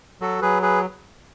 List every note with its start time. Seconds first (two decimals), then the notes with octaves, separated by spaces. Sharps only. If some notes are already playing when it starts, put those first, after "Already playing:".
0.21 F#3 F#4 A4
0.42 F#3 G#4 B4
0.62 G#4 B4